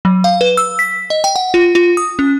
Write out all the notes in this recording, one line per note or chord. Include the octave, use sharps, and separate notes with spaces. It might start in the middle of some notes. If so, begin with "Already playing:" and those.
F#3
F5
B4
E6
B6
D#5
G5
F#5
F4
F4
D#6
C#4